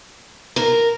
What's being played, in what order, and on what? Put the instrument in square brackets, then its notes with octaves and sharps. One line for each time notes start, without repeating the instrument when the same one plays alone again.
[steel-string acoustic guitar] A#4